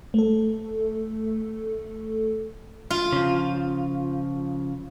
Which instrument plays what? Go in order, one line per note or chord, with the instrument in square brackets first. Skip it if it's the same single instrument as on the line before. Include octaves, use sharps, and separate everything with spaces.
[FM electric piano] A3 A4
[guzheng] F4
[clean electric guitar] C#3 F3